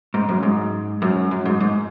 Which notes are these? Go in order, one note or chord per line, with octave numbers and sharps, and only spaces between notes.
G#2
F#2
G#2
F#2
F#2
G#2
G#2